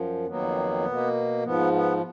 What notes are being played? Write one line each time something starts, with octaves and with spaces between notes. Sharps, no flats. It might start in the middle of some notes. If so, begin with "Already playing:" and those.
Already playing: F#2 F3
F2 D#3 F#3 A#3 B3
B2 A#3
G#2 F3 B3
B3